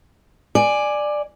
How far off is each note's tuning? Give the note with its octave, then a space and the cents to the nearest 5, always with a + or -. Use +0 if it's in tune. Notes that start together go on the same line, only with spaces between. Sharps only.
D5 +10 G#5 +0